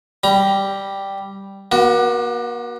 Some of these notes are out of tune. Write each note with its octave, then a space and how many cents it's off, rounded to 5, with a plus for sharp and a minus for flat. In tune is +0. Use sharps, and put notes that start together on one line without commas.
G3 +0 A#5 +30
A#3 +40 F#4 +0